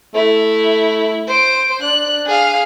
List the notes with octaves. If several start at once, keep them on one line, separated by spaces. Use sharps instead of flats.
A3 E4
C5 D7
D4 F#6
G#4 F5